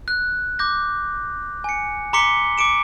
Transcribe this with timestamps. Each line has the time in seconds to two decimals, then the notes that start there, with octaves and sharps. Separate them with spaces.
0.08 F#6
0.59 D6 G6 A#6
1.64 G#5 C#7
2.13 A#5 C6 D6 B6 C#7 G7
2.58 D6 C#7 D7 E7